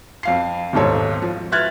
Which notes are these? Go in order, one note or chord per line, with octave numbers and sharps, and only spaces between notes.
F2 F5 C7
D#1 B1 G#2 A4 C#5
F3
B4 E5 F6 F#6 G#6 A6